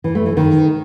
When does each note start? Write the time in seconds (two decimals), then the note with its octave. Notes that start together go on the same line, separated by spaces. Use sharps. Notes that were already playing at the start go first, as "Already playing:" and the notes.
0.04 E3
0.15 A3
0.26 E3
0.37 D#3